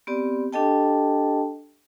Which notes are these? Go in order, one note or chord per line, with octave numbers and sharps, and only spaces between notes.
B3 C4 G4 D5
D4 G4 A4 D#5 G5 A5